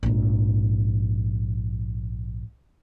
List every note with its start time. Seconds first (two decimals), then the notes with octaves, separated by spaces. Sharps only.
0.03 A#1 G#2